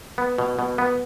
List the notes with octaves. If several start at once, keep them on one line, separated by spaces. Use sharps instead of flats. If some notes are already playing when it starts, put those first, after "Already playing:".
B3
B2
B2
B3